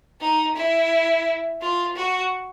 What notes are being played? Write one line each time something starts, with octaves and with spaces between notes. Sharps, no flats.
D#4
E4
F4
F#4